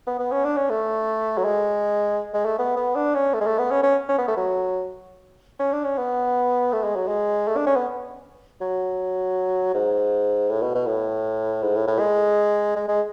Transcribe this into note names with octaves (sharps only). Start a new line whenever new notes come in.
B3
B3
C#4
D4
C#4
A3
F#3
G#3
G#3
A3
B3
B3
D4
C#4
A3
G#3
A3
B3
C#4
C#4
C#4
B3
A3
F#3
C#4
D4
C#4
B3
A3
G#3
F#3
G#3
A3
D4
C#4
B3
F#3
G#2
A2
B2
B2
A2
G#2
A2
A2
G#3
G#3
G#3